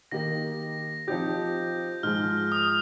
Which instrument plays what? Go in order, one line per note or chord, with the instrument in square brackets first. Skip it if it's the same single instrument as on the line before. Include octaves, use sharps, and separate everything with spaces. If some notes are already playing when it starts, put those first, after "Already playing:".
[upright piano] D#3 A#3 D#4 G4 [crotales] A#6
[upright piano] F3 C4 D#4 G4 [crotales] G6
[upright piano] G#2 F3 G#3 [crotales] F6
[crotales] D#6